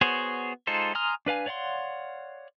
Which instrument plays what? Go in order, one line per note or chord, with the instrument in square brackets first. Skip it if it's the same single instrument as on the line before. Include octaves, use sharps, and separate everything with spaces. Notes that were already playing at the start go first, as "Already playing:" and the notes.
[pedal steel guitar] B3 F#4 G#4 C5 C#5
G#3 D#4 F4 A4 C5
G#5 A#5 C6 D#6 F6
D4 B4 F5 G#5
C#5 D5 F5 F#5 C6